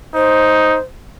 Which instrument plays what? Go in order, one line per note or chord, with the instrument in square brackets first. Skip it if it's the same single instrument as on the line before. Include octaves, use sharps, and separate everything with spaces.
[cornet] D#4 [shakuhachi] C5